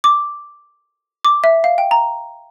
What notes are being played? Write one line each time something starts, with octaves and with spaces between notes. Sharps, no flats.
D6
D6
E5
F5
G5
A#5